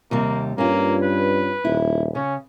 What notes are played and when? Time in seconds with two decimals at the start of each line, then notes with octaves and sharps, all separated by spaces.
0.11 D#2 C3 G3 A#3
0.58 G2 A#3 C#4 F4
1.02 B4
1.65 D#1 E4
2.15 C#3 C#4